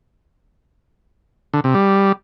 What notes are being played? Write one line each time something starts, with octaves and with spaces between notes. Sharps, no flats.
D3
C3
G3